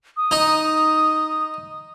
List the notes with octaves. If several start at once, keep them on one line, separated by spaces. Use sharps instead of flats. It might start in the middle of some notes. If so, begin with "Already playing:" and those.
D#6
D#4